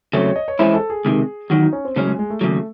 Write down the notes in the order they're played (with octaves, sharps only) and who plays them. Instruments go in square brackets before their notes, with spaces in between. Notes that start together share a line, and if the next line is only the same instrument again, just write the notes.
[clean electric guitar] C#3 F#3 A3 C4 [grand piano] C#5
[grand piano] C#5
D#5
C#5
[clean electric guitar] E3 G#3 C#4 E4 [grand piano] C5
[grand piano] A4
G#4
[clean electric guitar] C#2 C3 D#3
[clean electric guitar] E2 D#3 F#3 [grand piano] F#4
[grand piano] D#4
C#4
C4
[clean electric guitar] C#3 F#3 C#4 [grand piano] G#3
[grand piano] G#3
G#3
A3
[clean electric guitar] D#2 C#3 F#3 [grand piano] A3